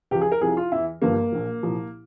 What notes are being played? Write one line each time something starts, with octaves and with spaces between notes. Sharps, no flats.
C#2 C#3 F3 G4
G#4
A#4
C2 C3 F3 G#4
F4
E2 E3 E4
G1 G2 F3 A#3
A#1 A#2 F3
C2 A#2 F3